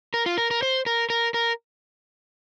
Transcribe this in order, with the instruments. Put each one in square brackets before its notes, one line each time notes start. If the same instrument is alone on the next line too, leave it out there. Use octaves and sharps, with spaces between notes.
[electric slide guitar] A#4
F4
A#4
A#4
C5
A#4
A#4
A#4